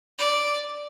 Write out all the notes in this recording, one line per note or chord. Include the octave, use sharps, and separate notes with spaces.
D5